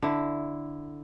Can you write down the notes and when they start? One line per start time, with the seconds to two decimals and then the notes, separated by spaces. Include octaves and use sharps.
0.02 D3 E4